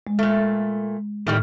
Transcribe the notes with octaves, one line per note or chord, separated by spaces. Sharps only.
G#3
A#2 A3 F6
E2 A2 D#3 G3 F6